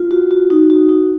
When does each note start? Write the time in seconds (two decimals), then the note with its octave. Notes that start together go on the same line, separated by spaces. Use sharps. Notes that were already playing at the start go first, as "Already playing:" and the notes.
Already playing: F4
0.11 F#4
0.31 F#4
0.50 D#4
0.70 F#4
0.89 D#4